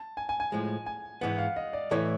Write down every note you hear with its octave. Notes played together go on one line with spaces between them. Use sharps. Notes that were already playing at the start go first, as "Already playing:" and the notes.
Already playing: A5
G#5
G#5
G#5
A2 F3 G#3
G#5
G#2 E3 G#3 B3 F#5
F5
D#5
D5
A2 E3 A3 C#5